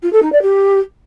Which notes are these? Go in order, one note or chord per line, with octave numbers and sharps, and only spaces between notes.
F4
A4
D#4
D5
G4